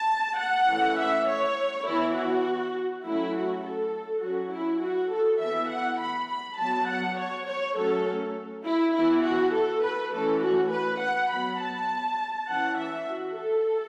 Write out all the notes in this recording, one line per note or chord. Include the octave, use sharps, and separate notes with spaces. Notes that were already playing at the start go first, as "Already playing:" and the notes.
Already playing: A5
F#5
E3 A3 C#4
E5
C#5
E3 B3 E4
F#4
F#3 A3 C#4 E4
F#4
A4
F#3 C#4 F#4
E4
F#4
A4
E3 B3 E5
F#5
B5
B5
F#3 B3 A5
F#5
C#5
C#5
F#3 A3 C#4 A4
E4
E3 B3 E4
F#4
A4
B4
E3 A3 C#4 A4
F#4
B4
F#5
F#3 B3 B5
A5
E3 C#4 F#5
E5
F#4
A4